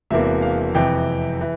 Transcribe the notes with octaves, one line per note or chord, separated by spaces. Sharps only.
E1 E2 C3 E3 A#3 E5
F5
F2 C3 E3 G5
E3